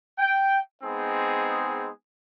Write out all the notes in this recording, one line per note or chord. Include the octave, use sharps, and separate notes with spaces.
G5
G#3 B3 C4 D#4 G#4